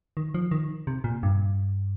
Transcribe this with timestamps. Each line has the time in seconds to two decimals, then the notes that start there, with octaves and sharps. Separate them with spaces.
0.17 D#3
0.34 F3
0.51 D#3
0.87 C3
1.04 A#2
1.23 G2